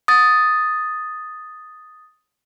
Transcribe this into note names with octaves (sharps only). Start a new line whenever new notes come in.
D#6 A6